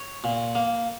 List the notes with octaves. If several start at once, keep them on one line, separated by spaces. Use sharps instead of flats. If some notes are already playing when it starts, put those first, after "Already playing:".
Already playing: C#5
A#2
A#3